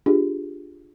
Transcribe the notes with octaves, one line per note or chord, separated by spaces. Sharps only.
D4 F4 G4 G#4